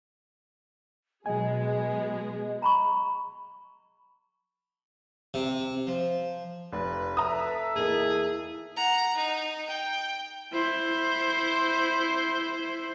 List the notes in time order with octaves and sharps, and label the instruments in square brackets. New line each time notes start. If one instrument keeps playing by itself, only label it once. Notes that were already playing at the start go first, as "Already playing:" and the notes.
[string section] B2 G#3 G#4 [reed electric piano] F#3 G#5 [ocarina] D#5
[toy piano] A#5 B5 C#6
[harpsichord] C3
F3
[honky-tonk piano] F1 [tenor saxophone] B4
[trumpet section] A4 E5 [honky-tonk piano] A#5 D#6
[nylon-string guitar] E2 A#3 D#4 [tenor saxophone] G#4
[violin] F#5 A#5
D#4
G5
[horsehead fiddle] E4 C5